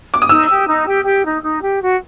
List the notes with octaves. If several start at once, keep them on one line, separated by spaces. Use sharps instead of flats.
D6
D#6
D#4 E6
G4
D#4
G4
G4
D#4
D#4
G4
F#4